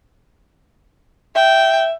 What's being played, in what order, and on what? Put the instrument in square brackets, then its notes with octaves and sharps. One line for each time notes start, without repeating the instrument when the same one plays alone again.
[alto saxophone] E5 [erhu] G5